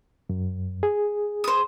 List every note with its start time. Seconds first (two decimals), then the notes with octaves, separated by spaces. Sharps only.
0.30 F#2
0.83 G#4
1.44 C5 D#6